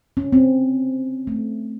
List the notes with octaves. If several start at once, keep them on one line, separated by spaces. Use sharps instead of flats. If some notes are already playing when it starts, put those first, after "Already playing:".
C#4
C4
A3